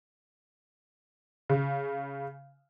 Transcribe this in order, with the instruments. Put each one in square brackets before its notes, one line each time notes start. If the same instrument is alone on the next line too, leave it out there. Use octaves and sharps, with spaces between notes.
[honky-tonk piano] C#3